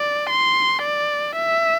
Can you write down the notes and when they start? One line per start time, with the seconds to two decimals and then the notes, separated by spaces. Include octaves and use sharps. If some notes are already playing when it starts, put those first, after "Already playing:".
Already playing: D5
0.30 C6
0.82 D5
1.37 E5